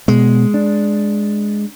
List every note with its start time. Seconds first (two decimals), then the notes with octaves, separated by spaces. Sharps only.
0.08 B2 G#3
0.54 D4